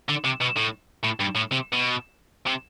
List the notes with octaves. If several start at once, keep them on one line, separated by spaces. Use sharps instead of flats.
D3
C3
B2
A2
A2
G2
A2
C3
B2
C3